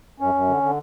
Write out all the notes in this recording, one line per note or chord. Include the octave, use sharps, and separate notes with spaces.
F#2 C#4
F#2
D3
D3